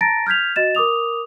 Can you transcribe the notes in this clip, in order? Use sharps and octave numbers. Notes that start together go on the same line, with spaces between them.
A5 A#5 A6 A#6 D7
F6 G6 G#6 B6 F7
F#4 D#5 A6 E7
A#4 D6 D#6 F7